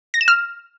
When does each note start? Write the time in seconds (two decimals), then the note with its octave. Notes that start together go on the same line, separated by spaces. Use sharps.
0.14 A#6
0.21 E7
0.28 F6